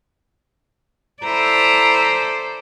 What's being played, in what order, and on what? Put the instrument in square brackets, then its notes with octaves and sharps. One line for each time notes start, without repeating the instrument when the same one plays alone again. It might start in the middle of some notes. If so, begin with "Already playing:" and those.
[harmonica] E4 A#5 [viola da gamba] A4 C5 D5